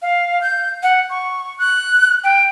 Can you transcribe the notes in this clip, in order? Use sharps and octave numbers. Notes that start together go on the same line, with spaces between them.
F5
G6
F#5
C#6
F#6
G5